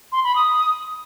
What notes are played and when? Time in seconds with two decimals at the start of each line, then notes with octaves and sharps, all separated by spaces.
0.12 C6
0.24 B5
0.36 D#6